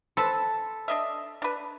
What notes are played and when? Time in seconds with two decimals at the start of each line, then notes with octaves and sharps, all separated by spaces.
0.17 A4 B4 C5 B5
0.88 D4 D#5 E5
1.42 D4 B4